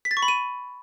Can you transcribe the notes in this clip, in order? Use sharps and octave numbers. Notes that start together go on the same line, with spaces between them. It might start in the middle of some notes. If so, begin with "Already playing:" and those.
B6
A6
C#6
B5
D#7